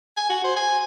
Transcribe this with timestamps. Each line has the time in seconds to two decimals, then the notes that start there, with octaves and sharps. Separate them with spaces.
0.17 G#5
0.30 F#4
0.44 C5
0.56 G#5